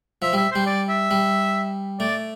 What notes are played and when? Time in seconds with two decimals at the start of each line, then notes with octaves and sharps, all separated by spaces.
0.22 F3 E5
0.33 G3 E5
0.52 G3 C5
0.66 D5
0.89 E5
1.11 G3
2.00 A3 D5